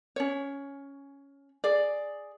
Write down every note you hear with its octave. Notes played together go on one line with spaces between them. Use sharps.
C#4 C#5
G#4 D5